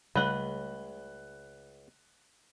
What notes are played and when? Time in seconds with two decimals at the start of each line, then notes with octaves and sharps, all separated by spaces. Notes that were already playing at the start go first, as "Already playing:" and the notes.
0.16 C#2 C#3 G3 A3 B4 F#5 F#6 G7